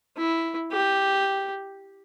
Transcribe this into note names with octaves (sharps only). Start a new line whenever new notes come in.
E4
G4